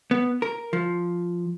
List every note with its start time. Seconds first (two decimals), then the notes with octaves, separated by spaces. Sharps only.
0.11 B3
0.42 A#4
0.73 F3